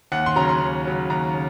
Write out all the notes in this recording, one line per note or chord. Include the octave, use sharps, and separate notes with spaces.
D#2 F#5
C6
C#3 F#3 C#4 A#5
C6
D#2
C#3 F#3 C#4
D#2 A#5
C#3